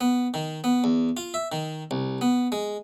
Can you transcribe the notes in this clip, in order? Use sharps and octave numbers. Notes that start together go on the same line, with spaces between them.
B3
D#3
B3
E2
F4
E5
D#3
C2
B3
G#3